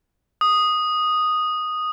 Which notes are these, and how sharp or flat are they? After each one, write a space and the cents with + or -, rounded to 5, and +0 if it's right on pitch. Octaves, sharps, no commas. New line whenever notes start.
D#6 -5